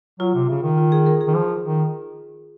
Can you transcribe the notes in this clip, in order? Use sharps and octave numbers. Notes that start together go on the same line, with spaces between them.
F#3 F4
C3
C#3
D#3
F4
G#4
A#4
G#4
D#3
F3
D#3